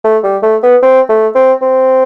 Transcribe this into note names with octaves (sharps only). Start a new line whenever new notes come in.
A3
G3
A3
B3
C4
A3
C4
C4